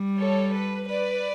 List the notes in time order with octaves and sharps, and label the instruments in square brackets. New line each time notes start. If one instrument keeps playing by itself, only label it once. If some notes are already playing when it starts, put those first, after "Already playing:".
Already playing: [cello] G3
[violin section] A4 C#5
B4
B4 D5